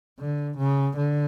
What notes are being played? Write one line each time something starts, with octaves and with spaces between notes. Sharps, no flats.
D3
C#3
D3